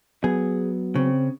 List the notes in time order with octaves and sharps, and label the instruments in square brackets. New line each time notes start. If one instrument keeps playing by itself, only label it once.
[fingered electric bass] F#3 B3 [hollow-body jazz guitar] G#4
[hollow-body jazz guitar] C#3 [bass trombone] C4